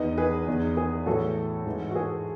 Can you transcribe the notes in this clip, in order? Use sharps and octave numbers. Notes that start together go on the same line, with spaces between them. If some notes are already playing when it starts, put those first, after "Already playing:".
Already playing: E2 D#3 B4 D#5
G#4 B4
E2 D#3
G#4
A2 E3 F#4 A4
G#2 E3
F#4
G#4